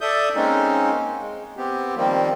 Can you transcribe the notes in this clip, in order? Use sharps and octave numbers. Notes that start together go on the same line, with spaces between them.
A4 D5 E5 D#6 G6
G#3 A#3 C4 C#4 D#4
G#3
B3 C4 G4
D#3 F3 G3 A#3 C4